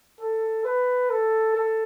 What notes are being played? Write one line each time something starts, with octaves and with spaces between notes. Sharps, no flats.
A4
B4
A4
A4